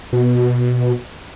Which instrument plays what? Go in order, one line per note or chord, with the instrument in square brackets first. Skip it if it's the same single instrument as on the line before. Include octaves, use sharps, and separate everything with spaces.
[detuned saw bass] B2